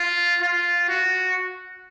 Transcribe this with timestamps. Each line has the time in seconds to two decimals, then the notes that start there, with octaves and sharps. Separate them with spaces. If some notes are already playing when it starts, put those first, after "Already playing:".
Already playing: F4
0.41 F4
0.88 F#4